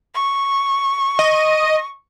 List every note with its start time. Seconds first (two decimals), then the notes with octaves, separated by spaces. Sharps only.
0.15 C#6
1.19 D#5